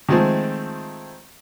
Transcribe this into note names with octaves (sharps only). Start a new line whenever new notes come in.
D#3 F3 G#3 A3 C4